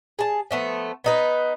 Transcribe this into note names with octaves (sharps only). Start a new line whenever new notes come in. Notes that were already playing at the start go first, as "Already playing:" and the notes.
G#4 A5
F3 A3 B3
B3 D#4 B4